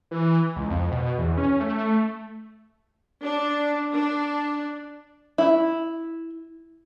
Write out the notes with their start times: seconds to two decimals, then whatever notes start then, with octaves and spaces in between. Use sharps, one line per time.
0.11 E3
0.56 C#2
0.70 F2
0.92 B2
1.18 E2
1.38 C#4
1.60 A3
3.22 D4
3.93 D4
5.38 E4